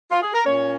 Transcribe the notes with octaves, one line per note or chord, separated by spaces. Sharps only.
F4
G#4
A#4
A#2 A#3 C#4 C#5